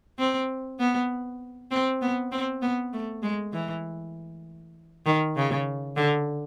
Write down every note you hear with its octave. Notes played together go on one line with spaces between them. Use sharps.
C4
B3
C4
B3
C4
B3
A3
G#3
E3
D#3
C#3
D3